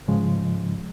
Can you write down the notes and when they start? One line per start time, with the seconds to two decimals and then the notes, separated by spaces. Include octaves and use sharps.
0.08 G#2 C#3 F3 G#3